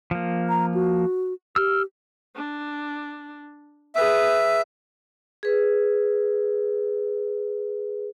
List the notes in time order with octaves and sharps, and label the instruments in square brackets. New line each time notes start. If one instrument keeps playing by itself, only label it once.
[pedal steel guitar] F3 A#3
[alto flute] A#5
F#4
[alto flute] G4 [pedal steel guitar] E6 F6
[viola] D4
[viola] G#4 B4 [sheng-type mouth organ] E5
[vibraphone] G#4 B4